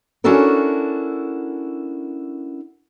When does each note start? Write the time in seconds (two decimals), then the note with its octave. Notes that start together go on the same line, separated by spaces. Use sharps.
0.24 C#4 D4 E4 F#4 A4 A#4